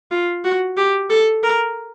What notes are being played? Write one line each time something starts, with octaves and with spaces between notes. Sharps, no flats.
F4
F#4
G4
A4
A#4